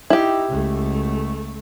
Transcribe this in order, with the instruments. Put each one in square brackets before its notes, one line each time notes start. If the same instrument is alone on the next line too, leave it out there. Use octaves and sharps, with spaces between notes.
[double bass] D#4 [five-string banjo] E4 G4
[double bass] C#2 A3